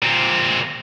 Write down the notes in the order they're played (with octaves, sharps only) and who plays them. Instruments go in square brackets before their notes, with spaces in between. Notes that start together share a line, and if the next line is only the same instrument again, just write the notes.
[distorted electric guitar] A#2 C4